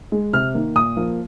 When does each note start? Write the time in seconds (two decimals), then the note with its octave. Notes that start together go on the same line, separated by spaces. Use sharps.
0.12 G#3
0.33 C3 F6
0.54 D#3 A#3
0.75 A#2 D#6
0.97 F3 A#3